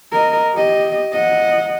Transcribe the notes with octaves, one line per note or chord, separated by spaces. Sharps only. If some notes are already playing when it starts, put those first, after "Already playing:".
A#4 D#5
G4 D#5
D#5 F#5